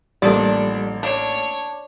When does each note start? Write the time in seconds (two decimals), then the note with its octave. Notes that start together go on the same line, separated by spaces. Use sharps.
0.22 A1 F3 G3 A#3 D4 A4 D5
1.03 D4 C#5 A5